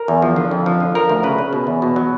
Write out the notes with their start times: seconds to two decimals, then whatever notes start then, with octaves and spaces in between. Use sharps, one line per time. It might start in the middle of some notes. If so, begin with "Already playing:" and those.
Already playing: A#4
0.08 E2
0.22 F3
0.36 D3
0.51 F2
0.66 F3
0.80 D3
0.95 F3 A#4
1.09 D2
1.23 C#3 B4
1.38 C#3
1.53 B2
1.67 E2
1.82 B2
1.96 F#3